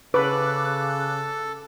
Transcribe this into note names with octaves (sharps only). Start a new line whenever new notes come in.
C#3 A4 B4 D6 F#6